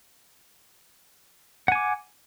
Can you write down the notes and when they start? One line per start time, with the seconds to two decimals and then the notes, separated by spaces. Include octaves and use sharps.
1.68 F#5
1.72 G#5
1.75 D6